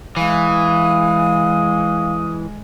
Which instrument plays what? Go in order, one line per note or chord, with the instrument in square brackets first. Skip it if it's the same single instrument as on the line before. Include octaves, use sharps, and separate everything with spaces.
[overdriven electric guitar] E3 [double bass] G#3 [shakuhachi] F5 [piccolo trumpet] D#6